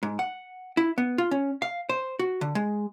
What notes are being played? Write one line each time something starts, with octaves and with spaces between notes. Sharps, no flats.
G#2
F#5
E4
B3
F4
C#4
F5
C5
F#4
D3
G#3